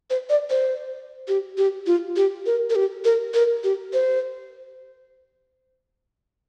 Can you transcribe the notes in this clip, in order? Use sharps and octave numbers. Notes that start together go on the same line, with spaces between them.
C5
D5
C5
G4
G4
F4
G4
A#4
A#4
G4
A#4
A#4
G4
C5